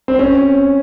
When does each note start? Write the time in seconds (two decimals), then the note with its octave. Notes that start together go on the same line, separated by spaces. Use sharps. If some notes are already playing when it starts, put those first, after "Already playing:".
0.08 C4
0.19 C#4